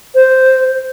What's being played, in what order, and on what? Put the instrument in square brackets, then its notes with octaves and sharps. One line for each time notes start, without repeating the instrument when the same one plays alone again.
[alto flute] C5